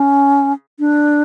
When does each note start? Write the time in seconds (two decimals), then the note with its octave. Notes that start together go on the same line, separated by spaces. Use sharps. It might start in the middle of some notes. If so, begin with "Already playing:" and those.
Already playing: C#4
0.80 D4